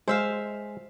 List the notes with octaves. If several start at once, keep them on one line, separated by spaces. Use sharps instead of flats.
G#3 C5 E5 F5